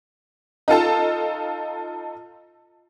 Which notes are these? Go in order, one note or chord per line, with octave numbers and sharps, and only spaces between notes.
D#4 F4 A4 A5